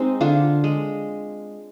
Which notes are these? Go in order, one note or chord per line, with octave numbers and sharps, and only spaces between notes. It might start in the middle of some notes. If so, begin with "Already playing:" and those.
Already playing: G#3 C4 D#4
D3 D4 F4
G#3